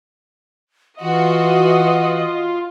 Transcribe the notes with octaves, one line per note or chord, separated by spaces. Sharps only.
E3 F4 F#4 D#5